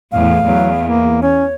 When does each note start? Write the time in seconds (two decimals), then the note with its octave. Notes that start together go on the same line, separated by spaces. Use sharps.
0.12 E2 A2 F5
0.45 E2 F#3
0.85 A#3
1.22 C#4 C#5